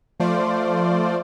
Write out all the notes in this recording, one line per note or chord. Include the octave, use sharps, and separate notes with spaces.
F3 A3 F4 C5 D5